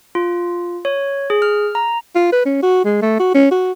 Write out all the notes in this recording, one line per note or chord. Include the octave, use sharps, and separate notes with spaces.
F4
C#5
G#4
F6
A#5
F4
B4
C#4
F#4
G#3
A3
F#4
C#4
F#4